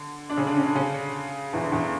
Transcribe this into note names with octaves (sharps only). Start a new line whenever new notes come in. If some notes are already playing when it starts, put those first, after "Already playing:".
Already playing: D3
D4
C#3 C#4
D3 D4
C#4
D3 D4
C#3 C#4
E2 E3
D3
E2 E3
D3